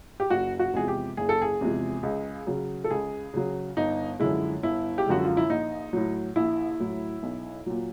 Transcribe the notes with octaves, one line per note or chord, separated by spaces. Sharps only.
G4
F#1 F#4
F#4
E2 C3 F3 G#3 G#4
G4
F#1 G#4
A4
G#4
E2 C3 F3 G#3
C#2
C#3 F#3
A4
C#2 G#4
C#3 F#3
G1 D#4
F#2 D3 F3 G#3 E4
G1 E4
G4
F#2 D3 F3 G#3 F#4
F4
E4
A#1 D#4
A2 F#3
A#1 E4
A2 F#3
B1
A#2 F#3